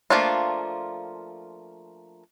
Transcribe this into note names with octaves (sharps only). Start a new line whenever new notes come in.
F3 A3 A#3 D4 F4